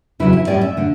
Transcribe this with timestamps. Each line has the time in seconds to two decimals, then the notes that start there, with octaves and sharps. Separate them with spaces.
0.20 E2 C#3 F#3 E4
0.33 E4
0.47 A2 G3 C#4 D5
0.61 E5
0.77 D3 A3